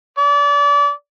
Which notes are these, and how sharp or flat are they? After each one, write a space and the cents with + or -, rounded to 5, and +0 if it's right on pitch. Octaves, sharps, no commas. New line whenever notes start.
D5 -30